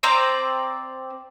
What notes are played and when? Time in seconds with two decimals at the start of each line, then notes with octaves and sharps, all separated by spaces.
0.03 C4 C5 D5 A#5